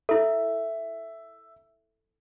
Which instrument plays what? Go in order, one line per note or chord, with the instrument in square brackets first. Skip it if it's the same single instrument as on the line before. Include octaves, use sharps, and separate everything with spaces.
[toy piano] E4 A4 [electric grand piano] E5